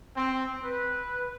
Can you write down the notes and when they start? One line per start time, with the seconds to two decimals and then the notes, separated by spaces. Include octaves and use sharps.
0.14 C4
0.64 B4